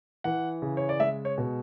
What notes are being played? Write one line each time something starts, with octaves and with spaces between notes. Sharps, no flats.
E3 F#5
C#3
C#5
D5
G#3 E5
C#5
B2